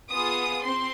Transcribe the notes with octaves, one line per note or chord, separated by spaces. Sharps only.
B3 F4 G#4 D#6
C4 C6